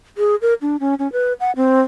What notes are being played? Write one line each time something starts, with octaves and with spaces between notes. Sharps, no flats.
G#4
A#4
D4
C#4
C#4
B4
F#5
C4